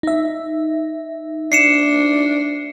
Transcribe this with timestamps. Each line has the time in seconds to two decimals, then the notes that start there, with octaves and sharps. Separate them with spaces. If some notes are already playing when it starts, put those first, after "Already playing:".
0.03 D#4 E5
1.52 D4 C7 C#7 E7